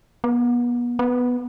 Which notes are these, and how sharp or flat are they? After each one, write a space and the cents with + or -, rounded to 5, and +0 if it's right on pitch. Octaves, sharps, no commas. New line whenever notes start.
B3 -35
B3 +0